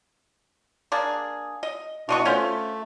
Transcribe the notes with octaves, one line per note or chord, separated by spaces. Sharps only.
A#3 D4 G#4
D#5
B2 E3 D4 F#4 D#5 C#6
A3 C#4 F4 C5